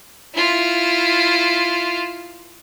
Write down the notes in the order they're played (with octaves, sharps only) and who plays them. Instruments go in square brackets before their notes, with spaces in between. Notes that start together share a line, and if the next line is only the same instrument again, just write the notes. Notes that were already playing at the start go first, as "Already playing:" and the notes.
[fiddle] E4 F4